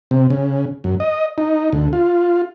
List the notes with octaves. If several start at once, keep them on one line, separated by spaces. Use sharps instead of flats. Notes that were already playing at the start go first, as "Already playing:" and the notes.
C3
C#3
F#2
D#5
D#4
D2
F4